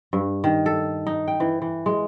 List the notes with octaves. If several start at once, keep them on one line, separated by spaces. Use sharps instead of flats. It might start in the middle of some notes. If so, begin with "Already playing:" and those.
G2
D#3
A4
D#4
G5
E3
E3
G#3